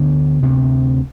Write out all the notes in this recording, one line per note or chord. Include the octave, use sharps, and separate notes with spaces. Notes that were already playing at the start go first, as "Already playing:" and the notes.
Already playing: D2 D3 B3
D2 C3